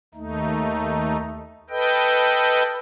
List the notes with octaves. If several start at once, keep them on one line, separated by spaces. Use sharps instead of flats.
D#2 A3 D#4
A4 B4 D#5 G5